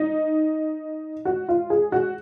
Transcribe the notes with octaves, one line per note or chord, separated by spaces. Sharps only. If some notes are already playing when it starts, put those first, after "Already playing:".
Already playing: D#4
F#4
F4
G#4
F#4